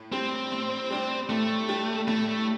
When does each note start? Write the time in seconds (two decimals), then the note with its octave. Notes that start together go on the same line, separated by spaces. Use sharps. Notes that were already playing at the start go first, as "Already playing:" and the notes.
Already playing: A2
0.12 G3 C4 D4 G4
0.52 A2
0.91 G3 D4 G4
1.30 A2 A3
1.69 G3 D4 G4
2.08 A2 A3
2.28 A3